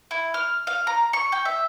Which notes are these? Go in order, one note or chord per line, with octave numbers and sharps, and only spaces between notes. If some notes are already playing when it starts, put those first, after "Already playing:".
E4
F6
F5
A#5
C#6
G5
E5